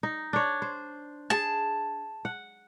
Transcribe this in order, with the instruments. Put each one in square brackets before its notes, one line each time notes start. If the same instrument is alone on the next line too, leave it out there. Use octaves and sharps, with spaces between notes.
[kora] D#4
D4 C#5
C5
[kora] G#4 [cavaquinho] A5
[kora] F#5